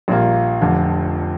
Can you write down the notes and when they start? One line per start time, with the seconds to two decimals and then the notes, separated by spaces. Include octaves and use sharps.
0.08 A#1 A#2 G3 A#3 F4
0.61 F1 F2 D3